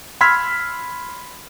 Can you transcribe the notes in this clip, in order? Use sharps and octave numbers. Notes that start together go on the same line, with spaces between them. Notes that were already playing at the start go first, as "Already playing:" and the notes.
B5 C6 E6 F6 G#6 B6